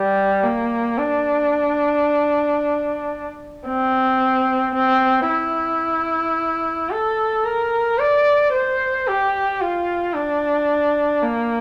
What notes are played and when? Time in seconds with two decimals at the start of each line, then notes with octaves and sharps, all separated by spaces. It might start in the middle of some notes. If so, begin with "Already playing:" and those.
Already playing: G3
0.43 A#3
0.97 D4
3.67 C4
4.75 C4
5.29 E4
6.90 A4
7.45 A#4
7.99 D5
8.52 C5
9.07 G4
9.60 F4
10.14 D4
11.22 A#3